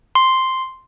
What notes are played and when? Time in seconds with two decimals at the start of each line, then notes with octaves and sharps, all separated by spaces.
0.15 C6